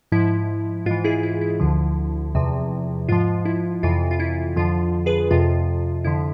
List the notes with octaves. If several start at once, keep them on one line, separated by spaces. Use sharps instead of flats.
G#2 F3 E4
G#2 E3 F4
E4 G#4
E4
E4
D2 D3 F3
E2 C3 F3
G#2 F3 F4
E4
F2 C3 E3 F4
F4
E4
F2 D3 F3 F4
G#4 B4
F2 C3 F3 F4
F2 D3 F3 E4